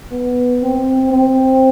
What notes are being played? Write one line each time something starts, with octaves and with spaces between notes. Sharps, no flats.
B3
C4
C4